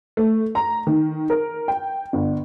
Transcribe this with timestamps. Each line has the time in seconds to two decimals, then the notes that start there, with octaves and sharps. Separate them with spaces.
0.17 A3
0.55 A#5
0.87 D#3
1.30 A#4
1.68 G5
2.13 G1